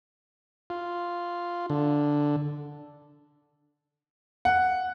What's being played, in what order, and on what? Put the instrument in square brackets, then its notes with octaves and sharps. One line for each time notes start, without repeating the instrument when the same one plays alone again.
[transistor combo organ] F4
D3
[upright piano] F#5